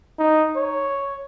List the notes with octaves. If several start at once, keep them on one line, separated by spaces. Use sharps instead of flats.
D#4
C#5